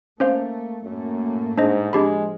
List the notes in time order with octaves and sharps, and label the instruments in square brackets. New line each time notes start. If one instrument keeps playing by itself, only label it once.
[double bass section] A3 [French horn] A#3 [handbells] C#4 C5 F5
[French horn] F#2 [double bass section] A2 A3 A#3
[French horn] G#2 [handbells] D4 C5 D#5
[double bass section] F3 [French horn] G#3 [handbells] D4 G4 B5